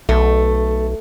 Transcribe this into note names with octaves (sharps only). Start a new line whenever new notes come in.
B1 A3